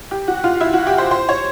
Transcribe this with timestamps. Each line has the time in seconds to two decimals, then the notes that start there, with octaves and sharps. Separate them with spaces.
0.11 G4
0.28 F#4
0.44 F4
0.60 E4
0.73 F#4
0.87 G4
0.98 C5
1.11 C5
1.29 C#5